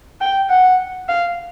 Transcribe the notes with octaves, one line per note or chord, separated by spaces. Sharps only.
G5
F#5
F5